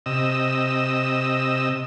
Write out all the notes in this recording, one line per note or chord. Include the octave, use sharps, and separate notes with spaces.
C3 D#5 E6